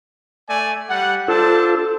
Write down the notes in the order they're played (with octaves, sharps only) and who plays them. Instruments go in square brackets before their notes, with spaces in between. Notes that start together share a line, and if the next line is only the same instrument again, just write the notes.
[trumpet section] A3 D5 G#5
G3 F#5
[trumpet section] D4 C5 A5 [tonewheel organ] F4 A4 E6